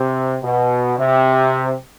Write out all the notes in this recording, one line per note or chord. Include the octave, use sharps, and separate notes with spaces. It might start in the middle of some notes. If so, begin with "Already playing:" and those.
Already playing: C3
B2
C3